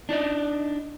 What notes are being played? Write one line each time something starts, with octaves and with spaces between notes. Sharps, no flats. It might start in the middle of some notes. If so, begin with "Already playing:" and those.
D4 D#4 D5 D#5